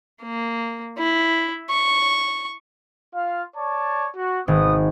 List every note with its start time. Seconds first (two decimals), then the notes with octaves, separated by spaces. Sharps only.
0.22 A#3
0.99 E4
1.70 C#6
3.15 F4 F5
3.56 C#5 D5 A5
4.15 F#4
4.48 G#1 B3 D#6